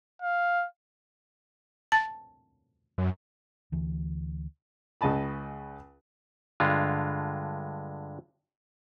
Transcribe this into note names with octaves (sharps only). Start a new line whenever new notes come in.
F5
A5 A6
F#2
D2 E3
C#2 C#3 D#5 A5 B5
G2 D3 G#3 F4